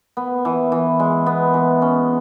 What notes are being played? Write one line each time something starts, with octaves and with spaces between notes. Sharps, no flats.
B3
E3
E3
G#3
B3
E3
C#4